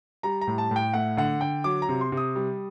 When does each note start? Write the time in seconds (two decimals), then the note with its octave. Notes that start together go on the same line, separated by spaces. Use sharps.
0.23 G3 A#5
0.41 A#5
0.47 A2
0.58 A5
0.71 A2 G5
0.94 A3 F#5
1.17 D3 F#5
1.41 D3 G5
1.64 F#3 D6
1.82 A#5
1.89 C3
2.01 C6
2.12 C3
2.17 D#6
2.36 G3